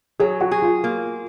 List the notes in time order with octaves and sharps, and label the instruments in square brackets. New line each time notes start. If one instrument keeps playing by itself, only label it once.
[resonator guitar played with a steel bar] F#3 [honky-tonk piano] G#4
[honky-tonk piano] F#4
[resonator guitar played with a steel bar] G#4
[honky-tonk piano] F4
[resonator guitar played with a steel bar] A#3